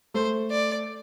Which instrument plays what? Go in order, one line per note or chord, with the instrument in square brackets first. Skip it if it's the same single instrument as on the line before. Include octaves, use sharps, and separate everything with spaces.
[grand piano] A3 [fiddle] C5
[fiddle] D5